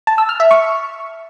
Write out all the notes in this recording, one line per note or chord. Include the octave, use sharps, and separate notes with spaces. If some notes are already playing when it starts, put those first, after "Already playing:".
A5
E6
F6
E5
C#6